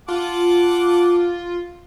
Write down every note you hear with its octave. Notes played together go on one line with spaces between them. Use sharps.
F4 F#5 A5 D6